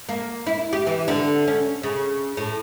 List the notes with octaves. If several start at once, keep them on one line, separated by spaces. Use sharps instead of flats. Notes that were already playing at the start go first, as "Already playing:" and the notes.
A#3
E4
G4
E3
D3
C#4
C#3
A2